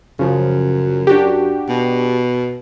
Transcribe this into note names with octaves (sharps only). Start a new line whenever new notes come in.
F#2 C#3 F3
D4 F#4 G4
B2